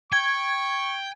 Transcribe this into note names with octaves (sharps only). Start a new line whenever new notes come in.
G5 C#6 G#6